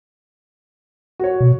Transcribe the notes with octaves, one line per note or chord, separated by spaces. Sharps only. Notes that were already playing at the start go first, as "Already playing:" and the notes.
F#4 C#5
B2